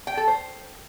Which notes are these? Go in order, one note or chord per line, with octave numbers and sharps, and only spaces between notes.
G5
A4
C5